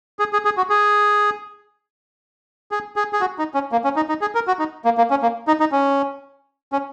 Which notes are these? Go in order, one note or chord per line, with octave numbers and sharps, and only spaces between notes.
G#4
G#4
G#4
F#4
G#4
G#4
G#4
G#4
F#4
D#4
C#4
A#3
C#4
D#4
D#4
G#4
A#4
F#4
D#4
A#3
A#3
C#4
A#3
D#4
D#4
C#4
C#4